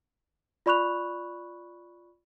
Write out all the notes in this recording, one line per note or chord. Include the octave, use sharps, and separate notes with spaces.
F4 D5 B5 C#6 F#6 F7